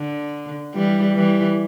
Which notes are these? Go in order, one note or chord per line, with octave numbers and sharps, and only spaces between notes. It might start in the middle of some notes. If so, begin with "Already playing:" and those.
Already playing: D3
E3 G3
E3 G3